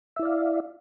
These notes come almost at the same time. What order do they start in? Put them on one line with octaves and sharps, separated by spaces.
E5 E4 D5 F5